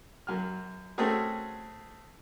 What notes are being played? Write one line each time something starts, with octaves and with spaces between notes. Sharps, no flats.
F#2 F#3 F6
A3 C4 C#4 F#4 G#4 A#4